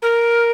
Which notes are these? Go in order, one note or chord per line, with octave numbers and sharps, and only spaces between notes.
A#4